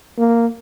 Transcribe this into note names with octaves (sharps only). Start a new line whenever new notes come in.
A#3